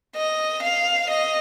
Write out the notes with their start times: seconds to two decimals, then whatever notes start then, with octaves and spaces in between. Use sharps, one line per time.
0.16 D#5
0.63 F5
1.10 D#5